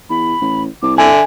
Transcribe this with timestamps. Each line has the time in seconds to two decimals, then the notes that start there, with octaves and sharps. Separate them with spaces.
0.10 E2 B5
0.41 A1
0.82 C2 D6
0.98 D3 E5 G#5